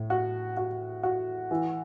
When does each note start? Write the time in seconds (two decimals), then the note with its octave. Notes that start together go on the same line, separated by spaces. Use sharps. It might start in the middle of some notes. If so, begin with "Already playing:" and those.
Already playing: A2
0.10 F#4
0.57 F#4
1.03 F#4
1.51 E3